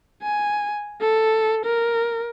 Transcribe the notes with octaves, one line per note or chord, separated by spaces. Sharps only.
G#5
A4
A#4